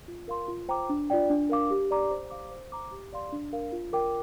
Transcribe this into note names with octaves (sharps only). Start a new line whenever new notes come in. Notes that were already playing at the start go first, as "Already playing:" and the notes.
F4
A#4 F5 C6
F4
C5 G5 A#5 D6
D4
F4 D5 G5
D4
A#4 F5 D6
G4
D5 A#5 D6
C5
F5 D6
C5
A#5 D6
G4
D5 F5 C6
D4
A#4 F5
F4
A#4 G5 D6